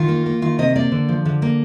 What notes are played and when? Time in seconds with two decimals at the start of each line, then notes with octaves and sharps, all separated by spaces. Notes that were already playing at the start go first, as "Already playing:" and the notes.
Already playing: D#3 F4
0.08 A#3
0.26 A#3
0.42 D#3 F4
0.59 C3 D#5
0.76 A#3 D5
0.92 D3
1.09 F3
1.25 D3
1.42 A#3